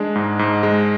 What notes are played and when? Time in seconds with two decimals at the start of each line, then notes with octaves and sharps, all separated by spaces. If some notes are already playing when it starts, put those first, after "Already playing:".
Already playing: G#3 D4
0.15 G#2
0.39 G#2
0.63 G#3